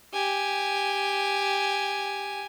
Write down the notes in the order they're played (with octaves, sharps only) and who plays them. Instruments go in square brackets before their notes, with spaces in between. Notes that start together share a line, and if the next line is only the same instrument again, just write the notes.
[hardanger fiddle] G4 G#5